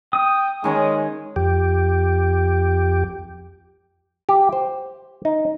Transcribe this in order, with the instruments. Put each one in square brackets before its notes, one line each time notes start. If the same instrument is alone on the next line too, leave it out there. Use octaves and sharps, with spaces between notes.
[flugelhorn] G5 [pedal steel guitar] D#6
[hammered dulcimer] D#3 C#4 A#4 [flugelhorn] G#3
[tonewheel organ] F2 G4
[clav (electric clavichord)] G4
C5
D#4